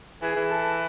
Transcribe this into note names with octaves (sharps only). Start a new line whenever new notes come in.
E3 G#4
E3
A4